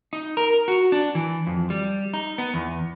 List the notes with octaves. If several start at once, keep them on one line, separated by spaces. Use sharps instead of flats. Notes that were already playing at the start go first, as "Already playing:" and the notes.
D#4
A#4
F#4
D4
E3
F2
G3
D#4
B3
E2